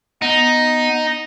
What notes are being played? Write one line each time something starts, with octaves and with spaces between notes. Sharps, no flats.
B3 D#4